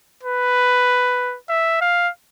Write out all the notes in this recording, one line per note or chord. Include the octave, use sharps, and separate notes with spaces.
B4
E5
F5